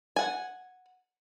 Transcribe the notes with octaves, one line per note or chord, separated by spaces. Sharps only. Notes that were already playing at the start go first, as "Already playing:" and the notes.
F#5 G#5